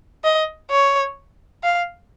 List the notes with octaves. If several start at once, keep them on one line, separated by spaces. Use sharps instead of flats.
D#5
C#5
F5